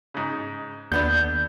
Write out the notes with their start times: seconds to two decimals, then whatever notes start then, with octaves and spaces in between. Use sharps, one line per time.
0.14 G#2 C#3
0.92 D#2 D3 B3 D4 G6